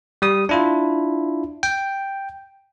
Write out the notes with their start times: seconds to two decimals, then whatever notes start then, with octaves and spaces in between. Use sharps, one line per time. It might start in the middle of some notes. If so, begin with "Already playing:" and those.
0.22 G3 D#6
0.49 D4 E4 F4
1.63 G5